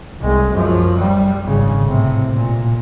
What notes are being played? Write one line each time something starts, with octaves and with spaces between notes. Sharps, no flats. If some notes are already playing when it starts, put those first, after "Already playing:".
C2 G#3
F#2 F3
G3
G#1 C#3
A2 C3
A#2